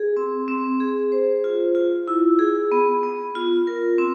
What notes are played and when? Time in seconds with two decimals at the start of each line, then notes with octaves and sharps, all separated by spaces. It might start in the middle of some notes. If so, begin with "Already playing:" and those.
Already playing: G#4
0.17 C4
0.48 C4
0.80 G#4
1.12 C5
1.44 F4
1.75 F4
2.08 E4
2.39 G#4
2.72 B3
3.03 B3
3.35 F4
3.67 A#4
3.98 C4